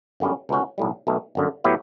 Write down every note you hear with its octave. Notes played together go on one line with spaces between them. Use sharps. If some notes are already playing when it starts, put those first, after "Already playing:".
G1 F#2 D3 G3 C#4
C#2 B2 A3 C#4 F#4
B1 A2 G3
B1 B2 A3
G1 F#2 D3
A2 F#3 B3 E4 G4